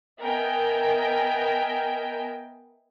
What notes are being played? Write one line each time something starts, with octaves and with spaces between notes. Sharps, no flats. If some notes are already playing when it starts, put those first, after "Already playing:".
B3 A#4 D#5 E5 G5 G#5